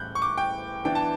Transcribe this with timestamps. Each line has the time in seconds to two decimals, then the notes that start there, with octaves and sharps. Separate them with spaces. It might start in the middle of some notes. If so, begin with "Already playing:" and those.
Already playing: A2 E3 G3 C#4 F#6 G6
0.15 C#6
0.22 D6
0.38 G5
0.85 E3 B3 D4 G5
0.95 A5